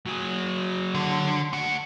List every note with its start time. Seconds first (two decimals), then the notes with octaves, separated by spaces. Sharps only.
0.06 F#3 G#4
0.94 D3
1.53 A3 F#5